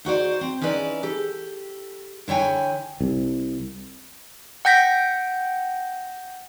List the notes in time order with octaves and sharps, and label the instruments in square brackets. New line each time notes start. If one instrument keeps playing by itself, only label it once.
[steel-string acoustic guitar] D#4 F#4 C5 D5
C4
C#4 D#4 E4 B4 D5
G4 A4
D3 E4 C#5 G5 G#5
[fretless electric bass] C2
[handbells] F#5 G5 G6 A#6 B6